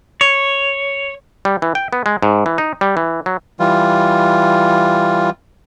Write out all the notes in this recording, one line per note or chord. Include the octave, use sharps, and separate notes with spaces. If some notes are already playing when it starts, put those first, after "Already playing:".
C#5
G3
E3
G5
B3
G#3
G#2
E3
D#4
G3
E3
F#3
E3 G3 F4